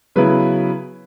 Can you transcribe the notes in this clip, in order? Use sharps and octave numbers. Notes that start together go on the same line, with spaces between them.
C#3 F#3 B3 E4 B4